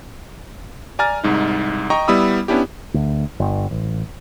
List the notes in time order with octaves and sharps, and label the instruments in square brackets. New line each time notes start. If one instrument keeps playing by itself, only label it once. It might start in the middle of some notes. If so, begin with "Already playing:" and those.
[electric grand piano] D5 G#5 A#5 F6 A6
C2 G#2 D#4
D#5 G5 A#5 C#6
G3 B3 E4 B5 D#6 E6
B3 C#4 D4 E4 G4
[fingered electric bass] D2
G1
A1